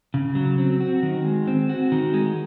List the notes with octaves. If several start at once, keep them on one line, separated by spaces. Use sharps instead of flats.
C#3
F#3
C4
F#4
D#3
G#3
C4
F#4
D#3
G#3